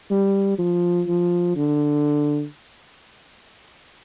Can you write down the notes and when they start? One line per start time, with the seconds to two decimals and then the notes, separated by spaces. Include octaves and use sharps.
0.11 G3
0.59 F3
1.08 F3
1.56 D3